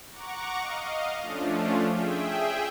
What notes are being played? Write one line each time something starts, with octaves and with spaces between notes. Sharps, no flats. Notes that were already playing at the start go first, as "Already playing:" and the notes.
F#5 A#5 C#6 D6
D#5 F5
F3 A3 C#4 D4 F4
G#4 E5 G5